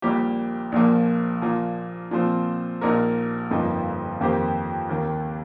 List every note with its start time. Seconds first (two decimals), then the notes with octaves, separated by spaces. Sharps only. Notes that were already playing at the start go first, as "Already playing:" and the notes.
0.02 A#1 A#2 G3 A#3 G4
0.72 A#1 A#2 F3 A#3
1.42 A#2 F3 A#3
2.11 A#2 F3 C4
2.81 A#1 A#2 A#3 D#4 A#4
3.51 G1 F2 F3 A#3 D#4
4.20 F2 D#3 A#3 G4 C5
4.89 D#2 D#3 A#3